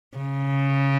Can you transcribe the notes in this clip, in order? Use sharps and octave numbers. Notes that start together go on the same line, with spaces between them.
C#3